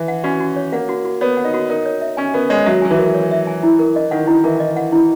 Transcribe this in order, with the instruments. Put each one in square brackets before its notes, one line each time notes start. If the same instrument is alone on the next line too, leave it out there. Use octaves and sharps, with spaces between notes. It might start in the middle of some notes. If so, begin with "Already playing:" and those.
Already playing: [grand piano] E3
[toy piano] F#5
[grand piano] C#4 [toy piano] F#4
[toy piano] F#4
C#5
[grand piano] A#3 [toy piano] F#5
[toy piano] F#4
F#4
[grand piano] B3 [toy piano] C#5
[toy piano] F#5
[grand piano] D#4
[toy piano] F#4
[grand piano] D#4 [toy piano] A#4
[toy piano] C#5
E5
[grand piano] C#4 [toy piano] G#5
[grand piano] B3 [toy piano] A#4
[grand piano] G#3 [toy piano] C#5
[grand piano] F#3 [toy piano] E5
[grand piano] F#3 [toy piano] G#5
[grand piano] E3
[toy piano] A#4
C#5
E5
G#5
E4
A#4
D#5
[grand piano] D#3 [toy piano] F#5
[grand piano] D#3 [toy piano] E4
[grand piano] E3 [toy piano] A#4
[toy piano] D#5
F#5
E4